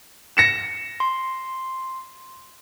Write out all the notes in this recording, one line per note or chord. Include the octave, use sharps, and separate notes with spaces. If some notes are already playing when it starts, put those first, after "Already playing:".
A#6 C#7 E7
C6